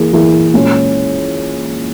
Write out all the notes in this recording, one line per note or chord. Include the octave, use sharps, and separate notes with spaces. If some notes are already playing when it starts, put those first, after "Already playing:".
Already playing: E3 A#3 E4 G#4
E3 A#3 E4 G#4
A#2 G#3 C#4